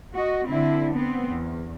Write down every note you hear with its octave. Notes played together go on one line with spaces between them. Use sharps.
F#4 D#5
D3 C4 E4
B3 C4
E2